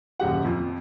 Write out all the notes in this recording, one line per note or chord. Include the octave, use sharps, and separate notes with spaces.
D#1 F#2 G4 F#5
F2 F3